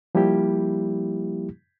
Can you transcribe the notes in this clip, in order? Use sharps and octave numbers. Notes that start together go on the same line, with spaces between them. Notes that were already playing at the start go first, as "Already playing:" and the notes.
F3 G3 A#3 E4 G4